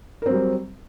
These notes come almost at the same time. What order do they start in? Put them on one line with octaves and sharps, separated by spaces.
A#4 C4 F#3 G3